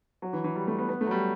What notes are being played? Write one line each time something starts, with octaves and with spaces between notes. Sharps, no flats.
F#3
E3
E3
G3
A3
B3
B3
A3
F#3
G3